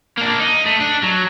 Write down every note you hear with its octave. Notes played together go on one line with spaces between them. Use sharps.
A#3 D4
D#4
A3
D4
F#3